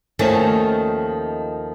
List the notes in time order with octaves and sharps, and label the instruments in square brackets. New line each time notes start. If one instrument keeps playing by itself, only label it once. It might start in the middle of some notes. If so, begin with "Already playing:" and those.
[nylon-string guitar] D#2 D#3 F3 A3 C#4